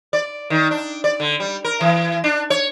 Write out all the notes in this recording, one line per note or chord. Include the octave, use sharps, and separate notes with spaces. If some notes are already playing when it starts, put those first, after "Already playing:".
D5
D#3
D4
D5
D3
G3
A#4
E3
D4
C#5